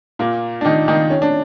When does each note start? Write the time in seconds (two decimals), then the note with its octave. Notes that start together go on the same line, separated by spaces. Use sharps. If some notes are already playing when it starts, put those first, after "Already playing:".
0.19 A#2 A#3
0.61 D4
0.65 D#3 D#4
0.88 D#3 D#4
1.10 C#4
1.22 D4